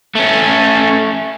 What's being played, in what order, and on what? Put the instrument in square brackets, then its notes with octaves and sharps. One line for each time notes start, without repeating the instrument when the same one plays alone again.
[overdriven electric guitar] A3 C#4